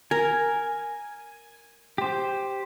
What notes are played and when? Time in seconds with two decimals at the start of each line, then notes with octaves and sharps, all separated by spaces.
0.11 A#4 G#5
1.98 G4 C5